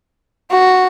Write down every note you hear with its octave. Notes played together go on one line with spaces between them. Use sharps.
F#4